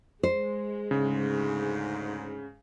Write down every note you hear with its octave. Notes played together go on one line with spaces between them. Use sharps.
G#3 C5
D2 G#2 C#3